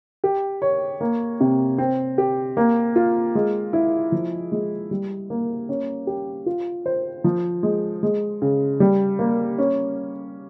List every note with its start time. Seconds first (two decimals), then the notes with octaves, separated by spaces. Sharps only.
0.24 G4
0.62 C#5
1.01 A#3
1.40 C3
1.78 C4
2.18 G4
2.57 A#3
2.96 F4
3.35 G#3
3.73 E4
4.12 F3
4.52 G#3
4.91 G3
5.30 A#3
5.69 C#4
6.07 G4
6.46 F4
6.86 C5
7.24 F3
7.63 G#3
8.03 G#3
8.42 C#3
8.80 G3
9.19 A#3
9.58 C#4